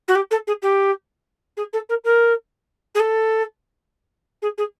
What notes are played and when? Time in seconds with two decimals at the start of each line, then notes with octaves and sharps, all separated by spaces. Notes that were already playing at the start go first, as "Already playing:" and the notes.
0.08 F#4
0.15 G4
0.31 A4
0.47 G#4
0.62 G4
1.57 G#4
1.73 A4
1.89 A#4
2.04 A#4
2.95 G#4
2.99 A4
4.42 G#4
4.57 G#4